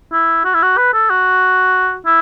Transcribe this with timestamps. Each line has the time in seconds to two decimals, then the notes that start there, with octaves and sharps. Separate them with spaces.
0.12 E4
0.44 F#4
0.54 E4
0.62 F#4
0.77 B4
0.93 A4
1.10 F#4
2.06 E4